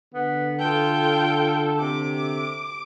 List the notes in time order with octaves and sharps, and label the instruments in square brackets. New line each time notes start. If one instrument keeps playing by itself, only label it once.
[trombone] D3 [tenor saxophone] B3
[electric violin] F4 G5 [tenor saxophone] A4
[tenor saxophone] C3 [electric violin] D6